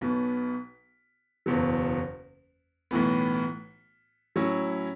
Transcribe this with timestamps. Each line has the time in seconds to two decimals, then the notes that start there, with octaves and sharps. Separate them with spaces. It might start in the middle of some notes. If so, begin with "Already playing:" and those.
0.01 B1 B2 B3
1.46 F#1 E2 B2 F#3
2.91 B1 A2 E3 B3
4.36 A2 F#3 C#4 E4